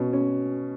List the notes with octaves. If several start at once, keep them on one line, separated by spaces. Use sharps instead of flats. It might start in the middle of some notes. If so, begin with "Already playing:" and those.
Already playing: B2 C#4
C#4